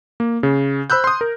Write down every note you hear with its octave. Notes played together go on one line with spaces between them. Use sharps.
A#3
C#3
C5 B5 E6 F#6 G6
C6 D#6
A#4